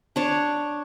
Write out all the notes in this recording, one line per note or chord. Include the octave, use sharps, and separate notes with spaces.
D4 C#5 A5